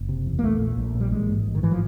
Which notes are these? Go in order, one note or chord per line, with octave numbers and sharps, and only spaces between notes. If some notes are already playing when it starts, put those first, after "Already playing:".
Already playing: F#1
C3
E2
A#3
A#1 A3
A#2
A#1
A#2
G3
A1 G#3
G#2
A1
D#3
G#2 E3
F3